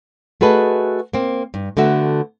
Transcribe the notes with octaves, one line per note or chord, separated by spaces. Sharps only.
A3 F#4 G#4 B4 D#5 A5
A#3 C4
G2
D3 A3 B3 F#4 E5